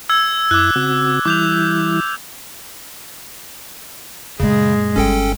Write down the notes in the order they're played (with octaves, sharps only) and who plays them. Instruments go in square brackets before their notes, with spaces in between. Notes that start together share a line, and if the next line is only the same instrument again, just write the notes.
[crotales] E6 G#6
[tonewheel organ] F#2 E4 [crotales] D6 F#6
[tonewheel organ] C#3 C4 F#4
[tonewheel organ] E3 G3 E4 [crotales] D6 G6 F7
[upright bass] F#2 A#2 [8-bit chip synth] C#3 [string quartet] G#3
[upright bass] G1 G2 [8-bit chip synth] C#4 A4 G5